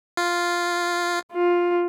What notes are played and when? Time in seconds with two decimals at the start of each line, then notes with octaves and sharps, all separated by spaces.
0.17 F4
1.33 F4